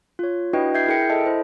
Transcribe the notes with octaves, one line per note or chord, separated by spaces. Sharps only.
F4 C#5
D4 E4 F#4 B4 D#5 G5
E5 G6 G#6 C7
E4 G#4 A#4 G5 C#7
A4 D#5 E5 A5
E4 C5 D#5